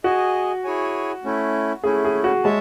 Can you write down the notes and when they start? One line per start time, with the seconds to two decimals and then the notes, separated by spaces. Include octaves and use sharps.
0.04 F#4 G#4 D#5 G#5
0.64 E4 G#4 C#5 G#5
1.24 A3 C#4 E4
1.84 A3 C#4 E4 G#4
2.05 G#4
2.24 F#4
2.44 G#3 C#5 E5 A5